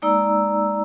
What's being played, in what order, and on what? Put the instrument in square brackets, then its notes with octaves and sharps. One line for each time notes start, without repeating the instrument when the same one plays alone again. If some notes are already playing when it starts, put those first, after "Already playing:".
[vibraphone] G#3 A#3 D#4 D5 A#5 E6